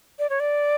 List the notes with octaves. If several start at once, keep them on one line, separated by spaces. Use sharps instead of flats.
D5
C#5
D5